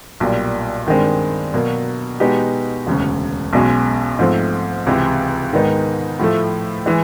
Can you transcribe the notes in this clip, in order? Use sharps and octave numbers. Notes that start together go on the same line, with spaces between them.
B1 A#2 G3
G2 D#3 G#3 C4
B2 F#3 A#3
B2 G#3 B3 D#4 G4
E1 D2 C#3
B1 B2 G#3 C#4
G#2 F3 A3 C4
C#2 C3 E3 G#3
G#2 D#3 G#3 B3 D#4
A2 F3 A3
E3 G#3